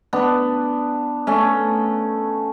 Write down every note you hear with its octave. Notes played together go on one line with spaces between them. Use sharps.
B3 D4
A3 C#4